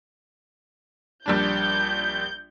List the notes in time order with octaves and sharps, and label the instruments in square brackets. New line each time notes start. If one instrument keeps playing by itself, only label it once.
[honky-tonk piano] A#1 G3 D4 [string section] G6